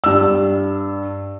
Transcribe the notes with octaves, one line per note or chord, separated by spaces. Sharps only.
G2 E6